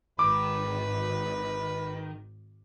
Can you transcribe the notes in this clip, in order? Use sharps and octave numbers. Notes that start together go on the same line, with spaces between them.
G#1 D#3 B4 D6